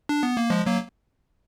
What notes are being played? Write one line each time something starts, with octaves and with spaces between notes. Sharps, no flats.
D4
B3
A#3
F3 G#3
F#3 A#3